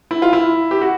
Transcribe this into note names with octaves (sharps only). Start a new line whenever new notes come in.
E4
F4
E4
G4
F#4